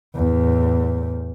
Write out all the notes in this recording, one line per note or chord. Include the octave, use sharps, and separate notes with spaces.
E2 A2